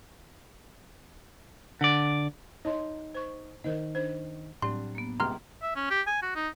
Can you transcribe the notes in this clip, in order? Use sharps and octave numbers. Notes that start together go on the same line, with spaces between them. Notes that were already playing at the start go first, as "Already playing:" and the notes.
D3 D5
D#4 C#5 A5 C6
C5 C#6
D#3 A#4 C5 D#5
D4 C5
A2 F#3 G3 C4 D4 C6
A#3 B3
G#1 C#2 C3 A#5 C6 F6
E5
C#4
G4
G#5
F#4
D#4